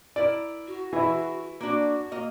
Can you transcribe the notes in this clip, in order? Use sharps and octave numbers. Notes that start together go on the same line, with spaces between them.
E4 A#4 D5
F#4
E3 E4 G#4
A#3 D4 F#4
A#3 D#5